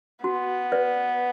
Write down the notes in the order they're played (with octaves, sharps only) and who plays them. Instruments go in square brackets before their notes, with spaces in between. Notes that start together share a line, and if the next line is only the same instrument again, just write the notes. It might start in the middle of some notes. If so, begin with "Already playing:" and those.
[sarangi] B3 [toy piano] F#4
[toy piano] B4 D5